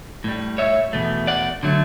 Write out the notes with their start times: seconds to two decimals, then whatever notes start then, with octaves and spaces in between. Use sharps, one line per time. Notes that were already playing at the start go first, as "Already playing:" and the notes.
0.24 A2 G3
0.58 C#5 E5
0.93 E2 B2 A3
1.27 D5 F#5
1.63 D3 F#3 A3